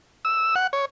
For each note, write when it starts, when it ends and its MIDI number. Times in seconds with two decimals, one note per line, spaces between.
0.25 0.55 88
0.55 0.67 78
0.73 0.85 73